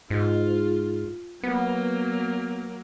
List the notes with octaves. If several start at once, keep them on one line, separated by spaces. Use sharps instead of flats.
G#2 F4
F#3 A#3 B3